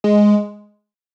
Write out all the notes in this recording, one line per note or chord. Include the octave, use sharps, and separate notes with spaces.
G#3